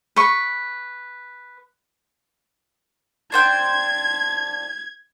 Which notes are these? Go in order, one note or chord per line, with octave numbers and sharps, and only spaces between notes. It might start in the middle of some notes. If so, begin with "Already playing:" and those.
B4 C#6
D4 C5 G5 G#6